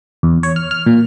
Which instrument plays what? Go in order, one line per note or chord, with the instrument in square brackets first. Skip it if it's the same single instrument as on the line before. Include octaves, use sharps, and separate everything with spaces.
[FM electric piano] E2
C#5
F6
F6
A#2